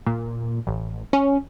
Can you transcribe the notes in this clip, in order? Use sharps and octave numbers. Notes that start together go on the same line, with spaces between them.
A#2
A1
C#4